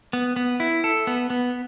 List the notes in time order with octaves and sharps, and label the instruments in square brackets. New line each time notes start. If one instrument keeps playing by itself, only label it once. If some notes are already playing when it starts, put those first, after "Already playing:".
[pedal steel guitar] B3
B3
E4
A4
B3
B3